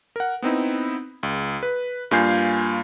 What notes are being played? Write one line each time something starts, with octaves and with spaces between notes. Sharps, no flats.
A#4 F#5
B3 C4 D#4 E4
C#2
B4
G2 A#3 F4 G#5 G6 C7